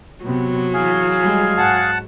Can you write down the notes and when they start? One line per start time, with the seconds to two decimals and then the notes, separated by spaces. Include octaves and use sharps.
0.25 C3 F#3 B3
0.74 E3 G#4 F5 G#5
1.23 G3 G#3
1.58 G#2 F#5 A5